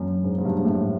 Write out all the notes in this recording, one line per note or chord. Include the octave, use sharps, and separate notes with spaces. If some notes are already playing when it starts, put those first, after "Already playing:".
Already playing: F#2
G#2
G#2
G2
G#2
A2